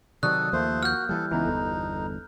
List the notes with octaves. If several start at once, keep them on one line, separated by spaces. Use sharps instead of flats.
C3 D#3 F#3 A4 D5 C#6 D#6 F#6
D#2 F3 A3 A#3 C5
F#4 F6 G6
E3 G3 A4
C#2 E3 B3 D#4 E4
G1 E2 A4